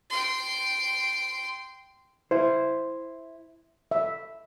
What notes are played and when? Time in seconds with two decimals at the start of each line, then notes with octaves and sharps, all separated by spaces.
0.10 G5 C6
2.31 E4 C5
3.91 E5